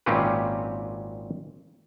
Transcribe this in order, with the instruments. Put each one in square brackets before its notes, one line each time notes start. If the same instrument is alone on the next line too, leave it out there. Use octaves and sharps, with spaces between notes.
[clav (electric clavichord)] G#1 A#2 C4 C#4 G4 B4